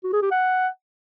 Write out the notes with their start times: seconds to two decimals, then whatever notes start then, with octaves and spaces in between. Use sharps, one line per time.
0.04 F#4
0.13 G#4
0.22 G4
0.31 F#5